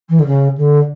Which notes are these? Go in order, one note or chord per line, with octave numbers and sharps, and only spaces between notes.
E3
D3
C#3
D3